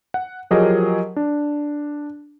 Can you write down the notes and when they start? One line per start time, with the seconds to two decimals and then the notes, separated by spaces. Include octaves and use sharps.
0.14 F#5
0.51 F3 F#3 G4 G#4 A#4 D#5
1.16 D4